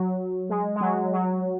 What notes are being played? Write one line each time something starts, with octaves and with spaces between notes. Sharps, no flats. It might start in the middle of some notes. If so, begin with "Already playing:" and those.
Already playing: F#3
G#3
G#3
F#3
F#3